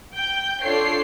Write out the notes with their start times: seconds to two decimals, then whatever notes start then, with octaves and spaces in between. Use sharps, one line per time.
0.15 G5 G6
0.63 D4 F4 A4 C#5 C7